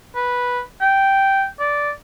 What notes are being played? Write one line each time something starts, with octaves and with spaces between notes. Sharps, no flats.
B4
G5
D5